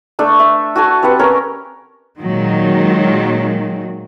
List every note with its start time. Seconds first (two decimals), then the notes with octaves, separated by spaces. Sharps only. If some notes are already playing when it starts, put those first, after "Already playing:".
0.19 A3 D4 A4
0.39 E5
0.76 F#4 A4 G#5 A5
1.03 C4 G4 B4 F#5
1.19 C#4 A#4 C#5
2.19 A#2 D#3 F#3 G#3